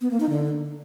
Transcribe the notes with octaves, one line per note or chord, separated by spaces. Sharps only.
B3
A#3
D#4
D3